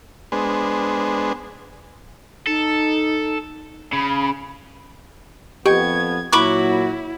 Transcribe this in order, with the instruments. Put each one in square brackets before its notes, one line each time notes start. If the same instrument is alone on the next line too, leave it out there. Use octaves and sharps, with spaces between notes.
[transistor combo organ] G#3 B3 D4 G#4 C5
[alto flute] D#4 [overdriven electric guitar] A4
[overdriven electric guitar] C#3 [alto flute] B5
[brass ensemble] F2 B3 [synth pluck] G4 D#5 G5 [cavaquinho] C#6 [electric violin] G#6
[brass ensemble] A#2 F#3 F#4 [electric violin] E4 [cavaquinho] B5 C#6 D6 [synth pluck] F#6